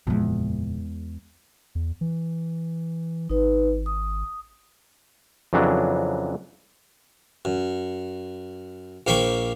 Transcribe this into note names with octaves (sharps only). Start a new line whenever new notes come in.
F#1 E2 A#2 F3 G#3
E2
E3
G#1 D#4 B4
D#6
F2 C#3 E3 F#3 D4
F#2
A#1 A#3 C5 G5 B5 C#6